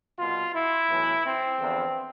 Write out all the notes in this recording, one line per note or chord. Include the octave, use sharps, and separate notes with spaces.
C2 B2 F4
E4
B1 A2 E3
C4
E2 D3 F3